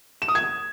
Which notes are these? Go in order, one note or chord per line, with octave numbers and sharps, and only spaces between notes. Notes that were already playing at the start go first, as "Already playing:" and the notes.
E7
D#6
G#6